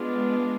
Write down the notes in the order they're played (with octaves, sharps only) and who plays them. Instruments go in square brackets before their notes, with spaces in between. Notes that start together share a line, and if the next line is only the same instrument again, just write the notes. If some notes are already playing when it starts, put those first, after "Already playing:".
Already playing: [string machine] G#3 [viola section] B3 D4 F4